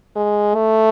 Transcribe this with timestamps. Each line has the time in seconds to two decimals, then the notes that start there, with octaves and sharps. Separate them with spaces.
0.16 G#3
0.55 A3